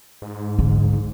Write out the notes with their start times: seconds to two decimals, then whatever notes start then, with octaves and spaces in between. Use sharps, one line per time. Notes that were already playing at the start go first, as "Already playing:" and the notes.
0.22 G#2
0.59 D3